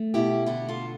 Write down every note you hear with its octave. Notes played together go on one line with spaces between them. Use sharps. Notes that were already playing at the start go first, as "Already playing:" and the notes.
Already playing: A3
B2 E4 G4
D3 E4 G4
F4 A4